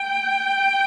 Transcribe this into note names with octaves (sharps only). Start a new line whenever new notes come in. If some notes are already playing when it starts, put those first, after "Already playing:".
Already playing: G5